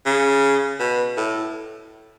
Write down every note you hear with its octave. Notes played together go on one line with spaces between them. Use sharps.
C#3
B2
A2